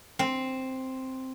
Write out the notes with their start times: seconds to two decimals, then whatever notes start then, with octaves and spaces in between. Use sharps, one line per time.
0.19 C4